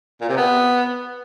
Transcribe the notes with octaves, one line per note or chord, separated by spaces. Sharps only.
A#2
C3
B3